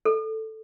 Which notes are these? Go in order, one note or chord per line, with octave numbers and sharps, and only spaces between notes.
A4